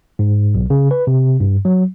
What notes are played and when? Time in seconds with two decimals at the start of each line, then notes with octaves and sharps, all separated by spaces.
0.19 G#2
0.55 B1
0.70 C#3
0.91 B4
1.07 C3
1.40 G2
1.65 F#3